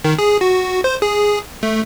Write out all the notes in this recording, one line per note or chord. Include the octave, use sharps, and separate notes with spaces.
D#3
G#4
F#4
C5
G#4
A3